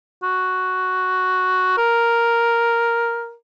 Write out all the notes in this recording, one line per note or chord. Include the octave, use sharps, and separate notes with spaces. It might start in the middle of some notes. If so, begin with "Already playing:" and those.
F#4
A#4